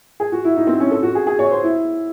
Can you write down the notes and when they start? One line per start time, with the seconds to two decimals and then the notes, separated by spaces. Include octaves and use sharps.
0.20 G#4
0.32 F#4
0.44 E4
0.56 D#4
0.67 C4
0.80 C#4
0.91 A4
1.03 F#4
1.15 G#4
1.27 G#4
1.39 C#5
1.51 C5
1.63 E4